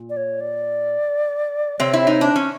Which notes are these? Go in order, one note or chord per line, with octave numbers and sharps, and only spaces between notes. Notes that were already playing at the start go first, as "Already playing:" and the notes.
Already playing: A#2
D5
C#5
D5
C3 C4 C#5
E4
D#4 C#5
D4
C#4